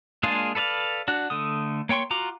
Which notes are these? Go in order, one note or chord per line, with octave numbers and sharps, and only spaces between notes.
G#3 A#3 D4 F4 G#4
A4 B4 D5 E5 F5
D4 F#4
D3 A3 D#6
A#3 C#5 G5 C6 C#6
F4 F#4 A#5 D6